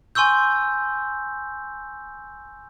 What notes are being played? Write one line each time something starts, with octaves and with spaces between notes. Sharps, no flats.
G#5 C6 C#6 E6 G6